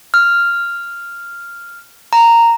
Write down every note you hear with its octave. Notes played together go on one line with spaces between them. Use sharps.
F6
A#5